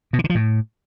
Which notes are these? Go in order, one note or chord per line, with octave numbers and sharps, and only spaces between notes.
B2
E3
D3
F3
A2